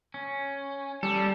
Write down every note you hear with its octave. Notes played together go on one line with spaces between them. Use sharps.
C#4
G3 A4